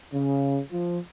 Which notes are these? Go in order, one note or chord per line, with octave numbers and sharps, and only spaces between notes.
C#3
F3